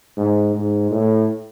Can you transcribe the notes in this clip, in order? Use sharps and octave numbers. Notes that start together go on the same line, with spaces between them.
G#2
G#2
A2